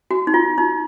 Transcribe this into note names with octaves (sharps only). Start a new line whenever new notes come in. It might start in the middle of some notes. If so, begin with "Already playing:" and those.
F#4
D#4
F4
D#4